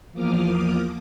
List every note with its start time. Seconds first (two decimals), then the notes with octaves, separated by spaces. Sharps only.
0.12 E2 F3 A#3 D6 D#6 F6